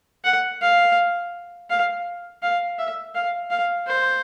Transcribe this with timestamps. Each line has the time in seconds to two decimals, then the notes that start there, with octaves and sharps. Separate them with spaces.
0.25 F#5
0.62 F5
1.70 F5
2.43 F5
2.79 E5
3.15 F5
3.50 F5
3.87 C5